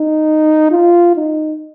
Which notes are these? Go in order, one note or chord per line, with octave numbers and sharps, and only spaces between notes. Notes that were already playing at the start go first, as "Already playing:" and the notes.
Already playing: D#4
F4
D#4